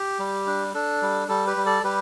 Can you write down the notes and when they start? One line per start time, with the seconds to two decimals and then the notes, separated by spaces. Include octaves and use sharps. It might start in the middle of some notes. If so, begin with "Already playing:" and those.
Already playing: G4
0.19 G3
0.47 D4
0.74 D4 A4
1.02 G3
1.28 G3 A4
1.47 G4 B4
1.56 G3
1.66 A4 D5
1.84 G3 G4 B4